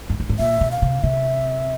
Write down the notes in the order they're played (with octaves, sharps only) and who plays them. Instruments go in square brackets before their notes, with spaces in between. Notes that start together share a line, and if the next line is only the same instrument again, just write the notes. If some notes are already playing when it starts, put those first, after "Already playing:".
[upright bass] G2
G#2
A2
[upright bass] A#2 [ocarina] E5
[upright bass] B2
[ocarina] F5
[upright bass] C3
[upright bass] C3 [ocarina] E5